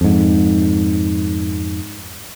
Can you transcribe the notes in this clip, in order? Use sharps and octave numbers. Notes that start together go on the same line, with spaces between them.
F2 G#2